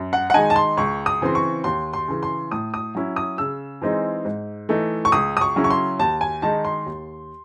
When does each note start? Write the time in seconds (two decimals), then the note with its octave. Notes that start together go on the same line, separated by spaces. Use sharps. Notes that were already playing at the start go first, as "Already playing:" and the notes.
Already playing: F#2
0.13 F#5
0.30 F#5
0.34 D#3 G#3 D#4 G#5
0.50 A5
0.56 C6
0.77 C#2 C#6
1.06 D#6
1.21 C#3 E3 C4 C6
1.35 C#6
1.64 D#2 C6
1.93 C6
2.08 C#3 E3
2.23 C6
2.52 A2 D#6
2.74 D#6
2.95 F#3 C#4 E4
3.16 D#6
3.38 C#3 E6
3.82 E3 G#3 C4 D#4
4.25 G#2
4.69 E3 A3 D#4
5.05 C#6
5.12 C#2 D#6
5.37 D#6
5.41 C#6
5.56 C#3 F#3 C#4 E4
5.64 C#6
5.70 C6
5.99 D#2 A5
6.21 G#5
6.42 D#3 G#3 D#4 A5
6.65 C6
6.86 D#2